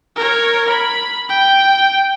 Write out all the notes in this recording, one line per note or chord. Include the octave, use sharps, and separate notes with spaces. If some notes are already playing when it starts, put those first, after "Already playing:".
A#4 C#5
B5
G5